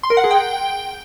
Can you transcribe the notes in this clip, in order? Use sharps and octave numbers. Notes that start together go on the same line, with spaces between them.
C6
A#4
F#5
G#4
G5